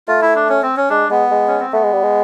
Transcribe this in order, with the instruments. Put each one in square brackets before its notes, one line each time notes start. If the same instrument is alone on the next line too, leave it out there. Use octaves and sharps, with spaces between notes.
[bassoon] A3 [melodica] F4
[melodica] E4
D4
C#4
C4
C#4
[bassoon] G#3 [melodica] D4
[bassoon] G#3 [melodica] B3
[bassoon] G#3
[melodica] C#4
C4
[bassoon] A3 [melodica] B3
[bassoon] G#3
G3
G#3